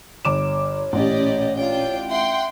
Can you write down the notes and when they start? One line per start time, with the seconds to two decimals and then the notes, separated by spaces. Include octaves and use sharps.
0.25 G1 C#5 D6 E7
0.93 A1 A#2 C#4 G4 D5 D#5
1.57 D4 F4 C#5 G5
2.10 E5 F#5 G5 C6